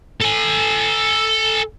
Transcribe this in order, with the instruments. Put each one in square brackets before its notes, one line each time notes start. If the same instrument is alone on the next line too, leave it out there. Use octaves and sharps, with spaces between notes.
[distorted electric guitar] A4 G#5